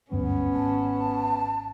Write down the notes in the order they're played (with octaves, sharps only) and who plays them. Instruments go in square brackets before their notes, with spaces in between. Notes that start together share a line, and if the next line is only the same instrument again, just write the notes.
[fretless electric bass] F#1 D2 G2 [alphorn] B3 [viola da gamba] C#4
[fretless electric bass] G#1 [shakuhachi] A5